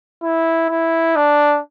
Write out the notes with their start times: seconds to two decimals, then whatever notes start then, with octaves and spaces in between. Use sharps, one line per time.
0.23 E4
0.70 E4
1.16 D4